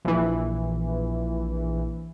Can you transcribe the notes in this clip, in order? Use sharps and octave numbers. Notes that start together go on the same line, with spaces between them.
A#1 E3